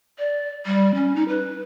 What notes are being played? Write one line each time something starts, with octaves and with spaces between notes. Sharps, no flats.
D5
G3
C#4
D#4
B4